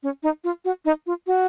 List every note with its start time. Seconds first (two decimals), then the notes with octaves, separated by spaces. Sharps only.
0.03 C#4
0.23 D#4
0.44 F4
0.65 F#4
0.85 D#4
1.06 F4
1.27 F#4